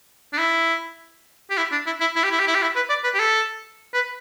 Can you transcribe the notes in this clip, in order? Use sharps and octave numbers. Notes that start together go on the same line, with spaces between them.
D4
E4
G4
E4
D4
E4
E4
E4
G4
E4
G4
E4
G4
E4
B4
D5
B4
G4
A4
B4